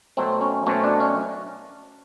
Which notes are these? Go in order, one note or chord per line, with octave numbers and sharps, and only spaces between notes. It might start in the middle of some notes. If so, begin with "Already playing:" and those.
B2 F#3 A3 C4
C#4
B2 F#3 A3 C4 C#4
D4
C#4